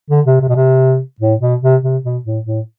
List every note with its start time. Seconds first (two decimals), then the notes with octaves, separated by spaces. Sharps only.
0.10 D3
0.26 C3
0.41 C3
0.49 B2
0.56 C3
1.20 A2
1.41 B2
1.62 C3
1.83 C3
2.04 B2
2.25 A2
2.46 A2